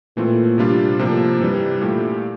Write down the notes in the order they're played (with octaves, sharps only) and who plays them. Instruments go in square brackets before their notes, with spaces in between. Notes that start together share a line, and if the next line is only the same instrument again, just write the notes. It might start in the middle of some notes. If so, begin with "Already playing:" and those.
[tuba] A#2 [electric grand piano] E3 A3 C4 F4
[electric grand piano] C3 G3 D4 F4
[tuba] A2 [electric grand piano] C3 F3 A#3
[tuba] G2 [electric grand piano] C3 E3 G3
[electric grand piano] A#2 A3 E4 G4